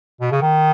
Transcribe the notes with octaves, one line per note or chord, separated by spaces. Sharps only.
B2
C#3
D#3